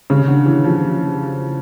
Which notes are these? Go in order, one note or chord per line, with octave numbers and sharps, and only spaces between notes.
C#3
D3
E3
F3